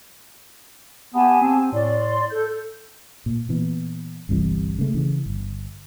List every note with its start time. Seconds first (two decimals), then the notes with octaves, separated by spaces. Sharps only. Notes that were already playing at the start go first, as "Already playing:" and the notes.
1.14 B3 G4 G#5 A5
1.41 C4
1.72 A2 D5 C6
2.30 A4 G6
3.26 A#2
3.49 A#2 E3 B3
4.29 G1 C2 C3 E3
4.79 C#3 A3
4.94 C#3 E3
5.26 G1